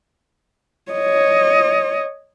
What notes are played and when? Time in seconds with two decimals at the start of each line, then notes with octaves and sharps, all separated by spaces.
0.92 C#5 D#5